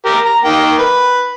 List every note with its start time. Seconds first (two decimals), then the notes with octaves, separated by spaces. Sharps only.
0.06 G4 A#4
0.25 A#5
0.45 D#3 A#3 G5
0.79 B4